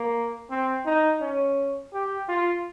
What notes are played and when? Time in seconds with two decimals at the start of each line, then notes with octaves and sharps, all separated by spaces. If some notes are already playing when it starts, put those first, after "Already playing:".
Already playing: A#3
0.50 C4
0.85 D#4
1.21 C#4
1.93 G4
2.28 F4